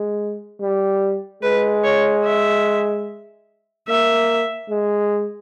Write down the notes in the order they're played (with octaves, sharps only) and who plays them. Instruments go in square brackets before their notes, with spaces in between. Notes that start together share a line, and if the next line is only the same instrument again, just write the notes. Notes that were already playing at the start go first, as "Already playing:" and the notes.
Already playing: [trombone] G#3
G3
[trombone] G#3 [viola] B4
[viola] C#5
E5
[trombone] A#3 [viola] E5
[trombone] G#3